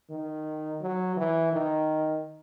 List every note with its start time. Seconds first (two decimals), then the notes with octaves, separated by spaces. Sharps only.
0.10 D#3
0.82 F#3
1.17 E3
1.53 D#3